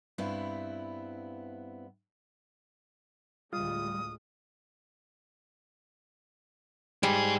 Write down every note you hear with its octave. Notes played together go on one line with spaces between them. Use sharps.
G2 B3 C4 E4
D2 A2 G3 G#3 F4 D#6
G#2 G3 G#4